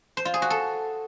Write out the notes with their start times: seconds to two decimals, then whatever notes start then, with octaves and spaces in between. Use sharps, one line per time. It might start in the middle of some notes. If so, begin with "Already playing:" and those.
0.17 C5
0.25 F4
0.34 G#4
0.42 F#4
0.50 A4